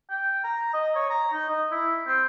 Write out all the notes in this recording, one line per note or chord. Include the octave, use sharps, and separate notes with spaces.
G5
A#5
D#5
C#5
A#5
D#4
D#5
E4
C4